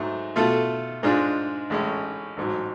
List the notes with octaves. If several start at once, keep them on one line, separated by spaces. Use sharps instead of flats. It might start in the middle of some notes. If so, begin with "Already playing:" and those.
Already playing: G#2 F#3 A3
B2 A3 F4 A4
G#2 G#3 D4 F4
A1 A2 G#3 C#4
A1 G#2 F#3